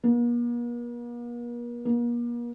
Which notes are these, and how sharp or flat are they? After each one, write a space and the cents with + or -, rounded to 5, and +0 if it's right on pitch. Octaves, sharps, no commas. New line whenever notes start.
A#3 +45
A#3 +40